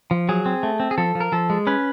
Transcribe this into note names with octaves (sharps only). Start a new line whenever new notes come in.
F3
F#3 G#4
C4
A3
C4
G#4
F3 A4
F3
A#4
F3 A4
G#3
C#4 B4